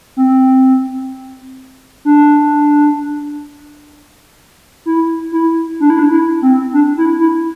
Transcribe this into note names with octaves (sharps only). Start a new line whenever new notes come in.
C4
D4
E4
E4
D4
E4
D4
E4
C4
D4
E4
E4